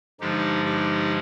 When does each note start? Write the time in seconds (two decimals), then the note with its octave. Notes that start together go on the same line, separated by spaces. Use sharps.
0.20 G2 D3 F3 G#3 D#4 G4
0.65 D#4 G4